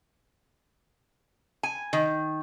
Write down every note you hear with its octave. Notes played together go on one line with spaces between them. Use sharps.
G#5
D#3